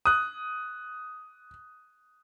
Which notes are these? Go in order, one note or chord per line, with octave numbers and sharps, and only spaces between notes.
D#6 F#6